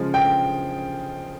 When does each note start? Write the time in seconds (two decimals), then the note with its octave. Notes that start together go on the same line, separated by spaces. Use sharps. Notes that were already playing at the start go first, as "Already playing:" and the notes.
Already playing: C#3 F3 G#3
0.14 G5